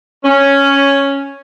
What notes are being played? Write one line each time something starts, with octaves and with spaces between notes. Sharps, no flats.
C#4